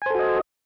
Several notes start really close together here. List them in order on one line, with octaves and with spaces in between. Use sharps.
G#5 C5 A4 F#4 D#5